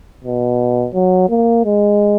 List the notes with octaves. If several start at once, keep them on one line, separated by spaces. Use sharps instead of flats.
B2
F#3
A#3
G#3